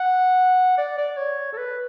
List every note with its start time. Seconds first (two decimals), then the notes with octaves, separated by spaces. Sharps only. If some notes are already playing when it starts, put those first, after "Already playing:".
Already playing: F#5
0.78 D5
0.98 D5
1.17 C#5
1.53 A4
1.57 B4